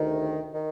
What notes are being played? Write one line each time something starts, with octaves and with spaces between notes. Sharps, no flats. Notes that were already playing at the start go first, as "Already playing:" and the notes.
Already playing: D2 C3 D#3
D#3